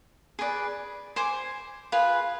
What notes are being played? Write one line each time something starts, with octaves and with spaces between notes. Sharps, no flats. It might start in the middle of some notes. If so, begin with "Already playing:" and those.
G#4 B4 D5
C5 G#5 D6
F4 G#4 B4